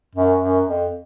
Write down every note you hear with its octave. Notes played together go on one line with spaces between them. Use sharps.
F#2
F#2
F2